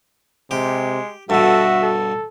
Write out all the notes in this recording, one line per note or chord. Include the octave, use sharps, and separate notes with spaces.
C3 G#3 G4
G2 B2 F#4 A4 E5
A4